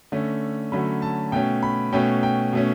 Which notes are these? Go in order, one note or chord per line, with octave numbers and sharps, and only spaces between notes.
D3 A3 C#4
D3 F#3 A3 C#4 B5
A5
B2 A3 C#4 G5
B5
B2 A3 C#4 G5
G5
B2 A3 C#4